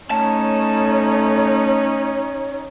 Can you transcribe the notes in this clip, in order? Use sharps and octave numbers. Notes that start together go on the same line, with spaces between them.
A3 C#4 D#4 C#5 A5